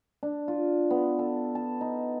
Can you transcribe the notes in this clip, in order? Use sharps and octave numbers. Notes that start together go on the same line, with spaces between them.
D4
F4
B3
A4
A5
D#4